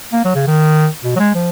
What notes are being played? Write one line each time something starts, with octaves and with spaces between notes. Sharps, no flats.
A#3
F#3
C#3
D#3
B2
F#3
G#3
F3